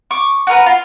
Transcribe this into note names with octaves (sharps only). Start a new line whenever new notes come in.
C#6 D6
F#4 A#4 B4
F4